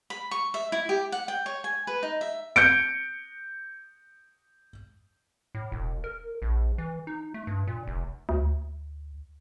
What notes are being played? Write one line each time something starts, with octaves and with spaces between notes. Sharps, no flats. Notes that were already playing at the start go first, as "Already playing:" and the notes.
B5
C#6
E5
E4
G4
F#5
G5
C#5
G#5
B4
D#4
E5
G6 C#7 D7
A2
E1
A#4
A#1
E3
D#4
A3
G2
A#2
F1
D2